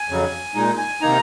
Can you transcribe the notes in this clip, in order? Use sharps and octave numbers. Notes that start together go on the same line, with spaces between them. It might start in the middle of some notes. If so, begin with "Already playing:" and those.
Already playing: G#5
F2 C#3 F#3
A#2 G#3 D#4
G#5
C3 D#3 A#3 D#4 A#5